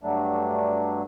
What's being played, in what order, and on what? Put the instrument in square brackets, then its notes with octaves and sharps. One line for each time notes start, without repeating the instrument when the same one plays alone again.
[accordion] G2 F#3 A3 D4